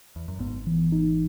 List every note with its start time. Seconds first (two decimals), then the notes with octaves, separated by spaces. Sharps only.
0.16 E2
0.28 F#2
0.39 G#1 G#2 B3
0.67 E3
0.92 D#4